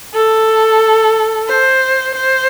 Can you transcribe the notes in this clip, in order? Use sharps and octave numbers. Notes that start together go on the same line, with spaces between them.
A4
C5
C5